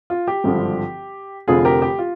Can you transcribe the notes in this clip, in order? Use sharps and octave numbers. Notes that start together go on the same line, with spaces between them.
F4
G4
G#1 G2 D3 F3
F1 F2 D3 F3 F4 G#4
G4 A#4
G4
F4